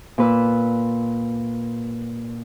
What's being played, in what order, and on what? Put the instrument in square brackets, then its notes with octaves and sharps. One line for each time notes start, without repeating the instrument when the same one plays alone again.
[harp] A#2 B4 E6